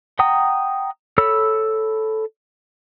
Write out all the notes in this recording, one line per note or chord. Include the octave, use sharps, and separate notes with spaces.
F#5 G5 A#5 D#6
A4 C#5 B5 E6